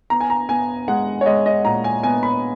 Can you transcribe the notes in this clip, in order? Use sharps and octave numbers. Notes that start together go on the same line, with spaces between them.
B3 A#5
G#5
A#5
B3 G#5
G#3 F#5
C#5
G#3 D#5
D#5
A#2 A#5
G#5
B3 G#5
B5